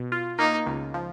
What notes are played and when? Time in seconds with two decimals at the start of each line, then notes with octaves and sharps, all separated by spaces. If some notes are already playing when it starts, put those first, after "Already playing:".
Already playing: B2
0.12 F4
0.39 A#3 D#4
0.66 C#2
0.94 F3